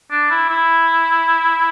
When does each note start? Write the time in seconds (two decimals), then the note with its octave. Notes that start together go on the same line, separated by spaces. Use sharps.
0.11 D4
0.30 E4
0.49 E4